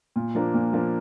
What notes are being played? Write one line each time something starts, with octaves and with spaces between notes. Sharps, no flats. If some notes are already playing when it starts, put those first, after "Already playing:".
A#2
F3 A#3 D4
A#2
F3 A#3 D4